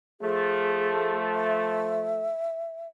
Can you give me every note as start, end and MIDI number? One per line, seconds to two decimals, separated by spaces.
0.21 2.31 53
0.21 2.31 57
0.21 1.17 68
1.33 2.88 76